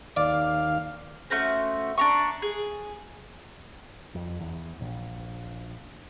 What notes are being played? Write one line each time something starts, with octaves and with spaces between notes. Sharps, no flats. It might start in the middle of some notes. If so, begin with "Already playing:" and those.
D#2 D5 F5
A3 C#4 F#4 C5
D4 A#5 C#6
G#4
F2
E2
A#1